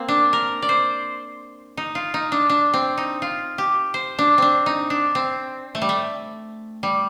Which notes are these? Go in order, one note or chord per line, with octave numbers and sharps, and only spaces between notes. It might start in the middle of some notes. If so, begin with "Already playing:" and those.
Already playing: A#3 C4
D4
A#4
D5
C5
D#4
F4
D#4
D4
D4
C4
D#4
F4
G4
C5
D4
C4 D4
D#4
D4
C4
A3
G3
A3
G3